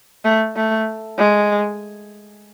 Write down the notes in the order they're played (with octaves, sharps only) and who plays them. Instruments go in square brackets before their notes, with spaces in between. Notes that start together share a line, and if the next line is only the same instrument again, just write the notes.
[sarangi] A3
A3
G#3